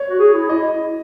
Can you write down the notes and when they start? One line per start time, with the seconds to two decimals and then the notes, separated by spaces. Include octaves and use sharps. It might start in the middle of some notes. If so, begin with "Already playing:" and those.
Already playing: C#5
0.09 F#4
0.19 G#4
0.34 E4
0.49 E4 D#5